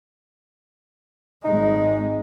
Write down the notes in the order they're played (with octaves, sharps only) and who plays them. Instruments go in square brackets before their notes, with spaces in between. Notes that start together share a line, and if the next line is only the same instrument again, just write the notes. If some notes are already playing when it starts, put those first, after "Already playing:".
[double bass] G#1 G#3 [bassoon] D#4